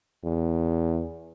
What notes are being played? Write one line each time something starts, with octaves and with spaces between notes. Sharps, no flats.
E2